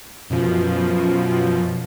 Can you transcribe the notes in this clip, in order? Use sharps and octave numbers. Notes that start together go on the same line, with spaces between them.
F#2 B2 F3